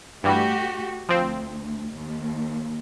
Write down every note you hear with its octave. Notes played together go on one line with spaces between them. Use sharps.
G2 E3 G3 A3 F#4 G4
D2 F3 C4
D#2